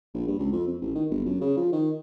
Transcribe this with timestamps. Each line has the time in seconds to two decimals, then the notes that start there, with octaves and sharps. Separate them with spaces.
0.14 A#1
0.28 G2
0.39 C#2
0.52 F2
0.67 F2
0.81 A1
0.95 D#3
1.10 G1
1.25 F#2
1.41 C#3
1.57 F3
1.72 D#3